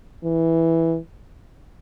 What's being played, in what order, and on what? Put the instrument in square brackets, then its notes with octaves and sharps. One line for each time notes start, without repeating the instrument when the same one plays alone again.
[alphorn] E3